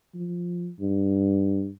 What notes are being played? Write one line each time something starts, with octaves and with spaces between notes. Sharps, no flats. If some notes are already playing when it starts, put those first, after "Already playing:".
F3
G2